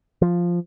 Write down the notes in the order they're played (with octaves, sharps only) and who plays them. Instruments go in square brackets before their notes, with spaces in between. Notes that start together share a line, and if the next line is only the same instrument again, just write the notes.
[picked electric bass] F3